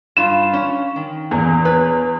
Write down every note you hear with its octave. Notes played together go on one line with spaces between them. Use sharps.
G2 F4 E7
C#4 C#5
D#3
E2 A#2
B4 C#5